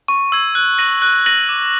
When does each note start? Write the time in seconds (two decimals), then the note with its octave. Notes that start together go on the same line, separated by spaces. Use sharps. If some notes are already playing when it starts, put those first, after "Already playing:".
0.08 C#6
0.32 E6 G#6
0.55 F#6
0.78 A#6 D#7 F#7
1.02 F#6
1.26 A#6 D#7 F#7
1.49 D6